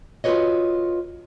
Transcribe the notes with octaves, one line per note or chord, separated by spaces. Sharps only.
F4 F#4 G#4 B4 C#5 D#5